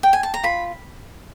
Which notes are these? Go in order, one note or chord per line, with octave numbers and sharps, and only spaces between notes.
G5
G#5
A5
A#5
F4 B5